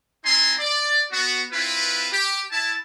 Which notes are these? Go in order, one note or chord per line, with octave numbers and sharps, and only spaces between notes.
C4 D#4 E4 G#5 A#5 C6
D5
B3 F#4
C4 E4 F4 B4
G4
E4 A5